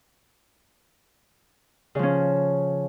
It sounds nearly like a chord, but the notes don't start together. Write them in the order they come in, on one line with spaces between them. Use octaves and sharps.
C#3 F3 C#4